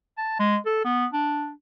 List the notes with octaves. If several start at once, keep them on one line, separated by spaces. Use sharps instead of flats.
A5
G#3
A4
B3
D4